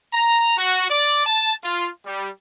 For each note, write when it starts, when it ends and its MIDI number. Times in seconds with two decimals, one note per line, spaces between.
0.14 0.57 82
0.57 0.86 66
0.90 1.24 74
1.26 1.53 81
1.63 1.89 65
2.06 2.29 55